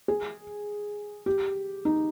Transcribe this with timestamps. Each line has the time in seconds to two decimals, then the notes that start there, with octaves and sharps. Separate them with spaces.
0.08 G#4
1.26 G4
1.85 D#4